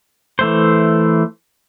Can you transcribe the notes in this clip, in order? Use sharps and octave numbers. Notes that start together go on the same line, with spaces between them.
E3 A3 C5